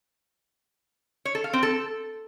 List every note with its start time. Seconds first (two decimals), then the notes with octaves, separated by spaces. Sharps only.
1.25 C#5
1.35 A4
1.44 F5
1.53 C4
1.63 A4